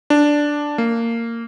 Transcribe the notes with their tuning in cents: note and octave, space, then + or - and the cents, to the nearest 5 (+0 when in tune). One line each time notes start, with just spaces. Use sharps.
D4 +0
A#3 -15